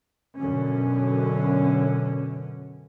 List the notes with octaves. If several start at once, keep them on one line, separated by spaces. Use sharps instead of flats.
F#2 B2 D3 C#4